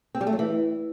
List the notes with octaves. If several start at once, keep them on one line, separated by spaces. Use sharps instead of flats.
C4
G3
A3
F#3
E3